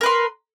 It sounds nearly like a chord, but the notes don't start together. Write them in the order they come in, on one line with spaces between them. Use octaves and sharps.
A#4 B4 C6